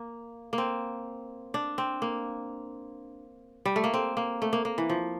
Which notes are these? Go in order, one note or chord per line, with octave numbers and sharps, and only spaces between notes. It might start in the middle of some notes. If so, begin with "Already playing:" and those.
Already playing: A#3
A#3
C4
D4
C4
A#3
G3
A3
A#3
C4
A#3
A3
A#3
A#3
E3
F3